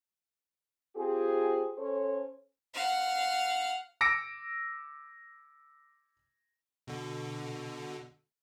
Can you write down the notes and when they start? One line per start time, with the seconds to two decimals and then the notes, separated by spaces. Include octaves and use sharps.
0.96 C4 F4 G4 G#4
1.78 C#4 A4 C5 C#5
2.74 F5 F#5
4.01 D6 E6 A#6 C#7 D7
6.87 B2 D3